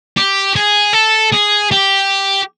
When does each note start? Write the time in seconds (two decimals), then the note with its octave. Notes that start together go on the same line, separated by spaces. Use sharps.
0.17 G4
0.56 G#4
0.93 A4
1.33 G#4
1.72 G4